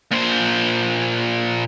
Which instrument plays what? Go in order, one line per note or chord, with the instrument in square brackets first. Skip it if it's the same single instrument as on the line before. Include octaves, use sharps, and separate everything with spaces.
[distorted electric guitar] A#2 C5